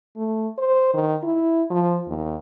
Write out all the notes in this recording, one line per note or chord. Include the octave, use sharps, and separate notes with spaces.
A3
C5
D#3
E4
F3
D#2